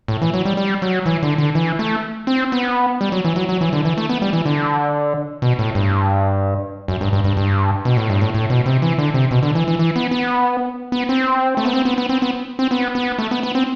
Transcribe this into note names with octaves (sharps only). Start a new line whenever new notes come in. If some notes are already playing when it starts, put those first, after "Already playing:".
A2
E3
F#3
G3
G3
F#3
E3
D3
D3
E3
A3
C4
B3
G3
F#3
E3
F#3
F#3
E3
D3
E3
A3
B3
G3
E3
D3
B2
A2
G2
F#2
G2
G2
G2
G2
B2
A2
G2
A2
A2
B2
C3
E3
D3
C3
B2
D3
E3
E3
E3
B3
B3
B3
C4
A3
B3
C4
B3
B3
C4
B3
C4
B3
B3
A3
B3
B3
C4